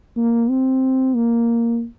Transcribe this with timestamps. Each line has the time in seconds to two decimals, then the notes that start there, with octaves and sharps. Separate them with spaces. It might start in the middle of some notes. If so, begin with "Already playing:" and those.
0.17 A#3
0.50 C4
1.16 A#3